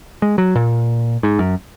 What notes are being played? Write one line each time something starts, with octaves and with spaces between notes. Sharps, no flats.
G#3
F#3
A#2
G#2
F#2